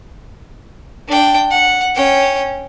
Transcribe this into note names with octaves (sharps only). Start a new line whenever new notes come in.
D4 G5
F#5
C#4 G5